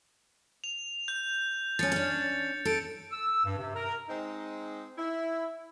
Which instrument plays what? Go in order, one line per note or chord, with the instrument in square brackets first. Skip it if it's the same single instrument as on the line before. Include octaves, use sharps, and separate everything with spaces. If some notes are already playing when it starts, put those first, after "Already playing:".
[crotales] F7
G6
[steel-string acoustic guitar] F3 C#4 [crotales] A6 C#7
[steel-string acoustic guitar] C#4 D4
[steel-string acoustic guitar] A4 [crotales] A6 C#7 D7
[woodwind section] E6
G2
C3
A#4
[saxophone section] G#3 C4 D#4
E4